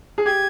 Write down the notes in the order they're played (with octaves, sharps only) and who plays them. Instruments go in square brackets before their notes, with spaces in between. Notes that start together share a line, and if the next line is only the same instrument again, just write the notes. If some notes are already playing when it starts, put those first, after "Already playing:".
[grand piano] G#4
[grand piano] G4 [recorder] G#6